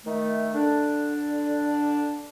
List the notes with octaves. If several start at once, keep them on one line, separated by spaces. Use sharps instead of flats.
D#3 A3
D3 D4